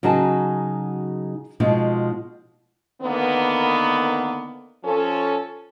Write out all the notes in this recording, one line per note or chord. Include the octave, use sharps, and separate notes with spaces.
C#3 F#3 D#4 F#4 G#4 A5
B2 F3 G#3 C4 D#4 F4
D3 D#3 A#3 B3
F3 C#4 A4